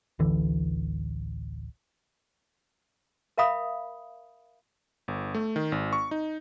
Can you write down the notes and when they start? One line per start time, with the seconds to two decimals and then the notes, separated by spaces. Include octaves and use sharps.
0.19 D1 A1 D3 E3
3.38 A#4 E5 F5 B5 D#6
5.08 G1
5.35 A3
5.56 D#3
5.72 G#1
5.93 C#6
6.11 D#4